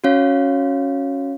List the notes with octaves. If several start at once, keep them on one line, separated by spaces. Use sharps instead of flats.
C#4 F#4 C#5 F5